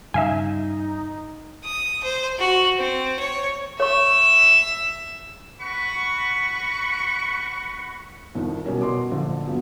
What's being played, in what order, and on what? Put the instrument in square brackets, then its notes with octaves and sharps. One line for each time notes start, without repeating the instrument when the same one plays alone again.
[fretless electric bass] G2 C#3 [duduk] D#4 [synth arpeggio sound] E5 F5 G#5
[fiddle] D#6
C5
F#4
C4
C#5
[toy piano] C#5 C#6 [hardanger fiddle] E5
[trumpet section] F#4 B4 F#5 B5 C#6
[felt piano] C2 F2 D#3
B2 G3 C#4 A#4
B2 C6 D6
A#1 D3 C5
G2 A#2 F#3 B3